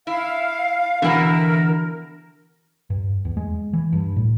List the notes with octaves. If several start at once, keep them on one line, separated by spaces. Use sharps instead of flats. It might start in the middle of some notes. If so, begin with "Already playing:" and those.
E4 F5
B2 D3 E3 E4 A#4 F#5
G2
E2
G#3
E3
G2
A2